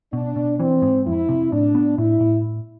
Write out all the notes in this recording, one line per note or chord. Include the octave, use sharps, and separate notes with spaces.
B2 D4
B2
E3 C4
G#2
F2 E4
C3
A2 D4
B3
A2 E4
A2